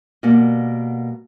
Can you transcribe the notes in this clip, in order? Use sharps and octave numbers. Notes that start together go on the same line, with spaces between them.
B2 G3 A#3 F#5